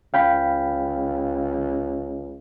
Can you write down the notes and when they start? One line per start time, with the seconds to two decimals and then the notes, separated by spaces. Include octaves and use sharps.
0.14 C#2 F5 G5 B5